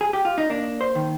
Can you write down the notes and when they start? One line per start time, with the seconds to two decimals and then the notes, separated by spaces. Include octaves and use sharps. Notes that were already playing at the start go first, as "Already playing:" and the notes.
0.01 G#4
0.13 G4
0.25 F4
0.38 D#4
0.50 A#3 D4
0.81 C5
0.95 D#3